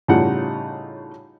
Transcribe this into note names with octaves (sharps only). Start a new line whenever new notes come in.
A2 C#3 G3 D#4 F4 F#5